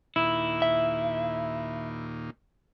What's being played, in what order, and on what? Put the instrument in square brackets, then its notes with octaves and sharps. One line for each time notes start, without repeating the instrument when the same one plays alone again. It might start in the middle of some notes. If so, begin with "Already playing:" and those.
[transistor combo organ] D#2 A#2 [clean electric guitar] E4
[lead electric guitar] E5